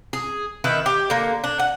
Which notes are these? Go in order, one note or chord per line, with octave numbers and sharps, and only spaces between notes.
G#4
D#3 E4 B4
G4
D3 A#3
D4
F#5